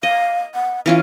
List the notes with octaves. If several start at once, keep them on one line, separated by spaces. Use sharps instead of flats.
D#5 F5
F#5
E3 C#4 F4 F5